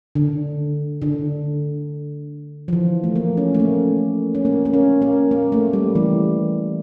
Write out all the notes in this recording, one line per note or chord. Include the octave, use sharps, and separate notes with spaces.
D3
D3
F3
E3
A3
A#3
C#4
A3
A#3
C#4
A#3
A#3
C#4
A#3
A#3
A3
G3
E3